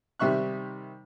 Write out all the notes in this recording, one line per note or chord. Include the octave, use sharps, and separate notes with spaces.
C3 D#3 G3 E5 C#6 F#6